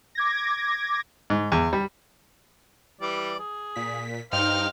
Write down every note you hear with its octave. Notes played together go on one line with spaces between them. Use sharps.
D6 G#6 A#6
G#2
E2
G3
E3 G3 D5
G#4
A#2 B6
G2 D#4 C5 F5 G5 F6